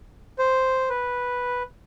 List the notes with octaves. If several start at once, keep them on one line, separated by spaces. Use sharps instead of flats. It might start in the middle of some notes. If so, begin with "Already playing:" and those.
C5
B4